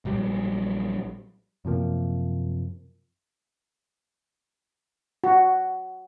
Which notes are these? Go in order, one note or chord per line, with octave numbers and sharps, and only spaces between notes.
A#1 F#3 G3
F#2 C3 F3 A#3
F#4